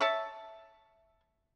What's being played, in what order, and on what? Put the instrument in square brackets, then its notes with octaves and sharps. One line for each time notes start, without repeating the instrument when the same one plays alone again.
[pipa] C#5 E5 A5